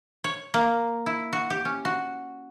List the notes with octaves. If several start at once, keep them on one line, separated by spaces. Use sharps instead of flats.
C#5
A#3
E4
F#4
G4
C#4
F#4